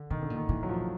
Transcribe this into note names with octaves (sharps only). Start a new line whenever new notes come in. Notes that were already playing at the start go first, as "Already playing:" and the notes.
Already playing: D3
B2 D#3
D3
A#2
D#3
A#2 E3
F#3
F3